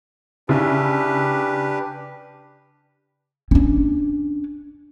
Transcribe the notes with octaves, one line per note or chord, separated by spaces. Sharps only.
C#3 D4 E4 G4 B4
C#4 D4